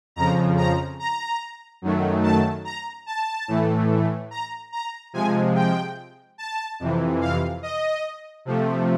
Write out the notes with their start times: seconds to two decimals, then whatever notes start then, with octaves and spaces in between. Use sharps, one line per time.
0.16 F2 C#3 F3 A#5
0.57 A#5
0.99 A#5
1.82 F#2 D#3 F#3 A3
2.23 A5
2.65 A#5
3.06 A5
3.48 A2 E3 A3
4.31 A#5
4.72 A#5
5.13 C3 F3 G#3 G#5
5.55 G5
6.38 A5
6.80 F2 C3 E3
7.21 F5
7.62 D#5
8.45 C3 F3 A3